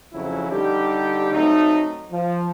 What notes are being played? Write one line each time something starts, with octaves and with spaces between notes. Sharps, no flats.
F2 C#3 F3 F#3 C#4 E4
D3 G3 D#4 G4
F#3 A3 C4 D#4
F3